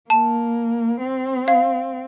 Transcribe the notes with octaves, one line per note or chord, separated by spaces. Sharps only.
A#3 A5
C4
F5